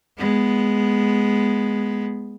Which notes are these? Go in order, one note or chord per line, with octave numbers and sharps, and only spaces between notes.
G#3 B3